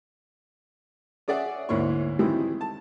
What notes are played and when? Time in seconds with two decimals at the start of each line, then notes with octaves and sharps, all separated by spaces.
1.28 C#4 G#4 D5 E5 F#5
1.69 D2 G#2 A#3 E4 C#5 C#6
2.19 D#3 E3 G3 G#3 C4 E4
2.61 A5